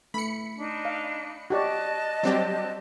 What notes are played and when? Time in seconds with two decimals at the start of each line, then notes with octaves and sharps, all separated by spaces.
0.14 A3 B5 C#7
0.57 D4 D#4
0.85 F5
1.50 F#4 G4 D5 D#5 A5 F#6
2.23 F#3 G3 C4 G4 D5